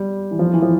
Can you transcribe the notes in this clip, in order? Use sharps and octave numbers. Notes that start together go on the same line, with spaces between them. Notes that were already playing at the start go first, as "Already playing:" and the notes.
Already playing: G3
E3
F3
E3
F3